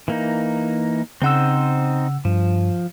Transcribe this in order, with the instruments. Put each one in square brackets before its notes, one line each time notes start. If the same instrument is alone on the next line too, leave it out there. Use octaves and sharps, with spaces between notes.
[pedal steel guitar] E3 A#3 D#4
[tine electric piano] C#3 F#5 E6 [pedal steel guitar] C4 D#4 C5
[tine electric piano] G2 [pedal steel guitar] F3